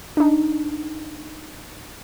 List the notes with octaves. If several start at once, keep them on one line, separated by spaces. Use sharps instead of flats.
D4 D#4